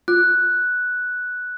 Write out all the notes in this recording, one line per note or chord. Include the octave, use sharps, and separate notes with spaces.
F4 F#6